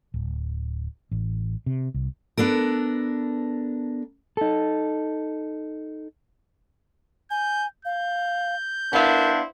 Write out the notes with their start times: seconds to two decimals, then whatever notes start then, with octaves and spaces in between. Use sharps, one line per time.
0.14 D1
1.11 A1
1.66 C3
1.94 C2
2.37 B3 D4 A4 A#4
4.37 D#4 A4
7.31 G#5 G6
7.85 F5 G6
8.93 B3 D4 E4 A#4 C5 F5